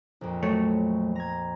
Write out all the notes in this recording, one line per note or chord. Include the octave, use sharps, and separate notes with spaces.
A#1 F2
F#3 A3 C#5
A#5 G#6